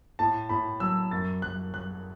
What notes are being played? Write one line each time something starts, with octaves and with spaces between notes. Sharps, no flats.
A2 A5
A2 B5
F#3 E6
F#2 A6
F#2 F#6
F#3 F#6